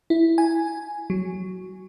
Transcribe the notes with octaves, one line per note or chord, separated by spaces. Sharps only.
E4
G#5
F#3